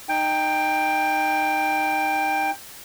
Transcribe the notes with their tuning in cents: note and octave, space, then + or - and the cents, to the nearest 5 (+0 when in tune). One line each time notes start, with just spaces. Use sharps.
D#4 -20 G5 +15